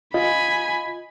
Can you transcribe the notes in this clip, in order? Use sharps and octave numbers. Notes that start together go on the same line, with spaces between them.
F4 D#5 G#5 B5